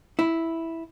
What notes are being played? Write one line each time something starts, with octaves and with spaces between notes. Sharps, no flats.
E4